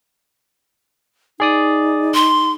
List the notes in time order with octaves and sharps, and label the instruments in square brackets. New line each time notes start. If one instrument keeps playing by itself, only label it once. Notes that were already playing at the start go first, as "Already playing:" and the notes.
[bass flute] D#4 [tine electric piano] G#4 D5 D#6
[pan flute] C6